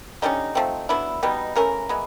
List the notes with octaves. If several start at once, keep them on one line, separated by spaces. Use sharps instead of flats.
D3 G3 A#3 C#4 D#4
F3 A3 C4
F#3 B3 D4 E4
B2 G3 B3 D#4
C#3 E3 A3 C#4 A#4
E3 G#3 B3